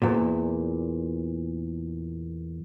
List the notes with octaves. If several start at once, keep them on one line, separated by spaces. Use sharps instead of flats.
E2 A#2